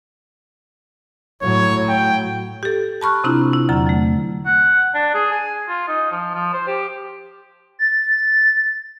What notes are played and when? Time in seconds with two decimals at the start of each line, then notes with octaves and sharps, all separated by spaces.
1.42 A2 F#3 C#5
1.89 G5
2.63 G4 A4
3.01 A5 B5 C#6 F6 F#6
3.24 C3 C4 D4 E4 F4 A#5
3.53 E4
3.69 E2 D3 F#3 A#5
3.86 F#3 A3
4.46 F#5
4.95 D4
5.14 G#4
5.31 G#5
5.68 F4
5.88 D#4
6.11 F3
6.34 F3
6.53 C5
6.68 G4
7.79 A6